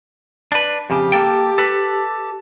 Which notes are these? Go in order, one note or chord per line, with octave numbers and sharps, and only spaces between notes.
D4 B4
F2 C#3 G4
A#3 A4 G5
A4 B4